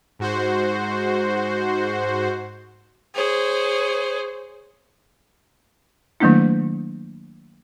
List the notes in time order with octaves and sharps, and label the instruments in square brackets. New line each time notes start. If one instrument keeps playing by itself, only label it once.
[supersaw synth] G#2 F#4 C5
[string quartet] G#4 C5 C#5
[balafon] D#3 F#3 A3 A#3 D4 E4